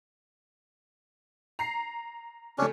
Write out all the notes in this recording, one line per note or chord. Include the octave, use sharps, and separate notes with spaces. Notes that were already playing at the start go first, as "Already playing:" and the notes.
A#5 C7
C#3 A3 C#4 D4